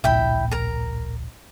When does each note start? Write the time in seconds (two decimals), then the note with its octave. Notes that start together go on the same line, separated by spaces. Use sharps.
0.04 D1 A#1 E4 G5 B5
0.51 A#4 A#5